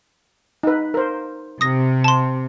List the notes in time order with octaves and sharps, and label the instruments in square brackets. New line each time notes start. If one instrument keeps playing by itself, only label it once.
[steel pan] D#4 B4
A#4 C5
[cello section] C3 [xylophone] D#6 A#6
[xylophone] A5 C6